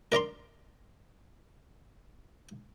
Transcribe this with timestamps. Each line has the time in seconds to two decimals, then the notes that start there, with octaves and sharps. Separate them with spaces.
0.12 A#4 D5 A#5 C6